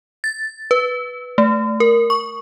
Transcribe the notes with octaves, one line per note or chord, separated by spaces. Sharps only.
A6
B4
A3
A#4
C#6